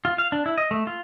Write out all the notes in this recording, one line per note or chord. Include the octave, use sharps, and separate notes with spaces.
F4
F5
D4
E4
D#5
A3
F4